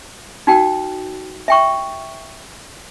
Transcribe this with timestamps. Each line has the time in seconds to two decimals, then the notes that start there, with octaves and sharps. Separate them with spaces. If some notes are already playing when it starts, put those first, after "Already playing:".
0.47 D#4 F#4 G5
1.48 E5 G5 C#6